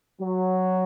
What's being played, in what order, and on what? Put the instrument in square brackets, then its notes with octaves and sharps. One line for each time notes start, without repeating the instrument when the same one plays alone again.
[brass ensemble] F#3